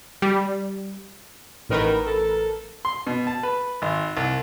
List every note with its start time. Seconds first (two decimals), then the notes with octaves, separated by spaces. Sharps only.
0.22 G3
1.69 A1 F#2 D#3 A#4 B4
2.04 A4
2.85 C6
3.07 B2
3.27 A5
3.43 B4
3.82 G#1
4.17 C2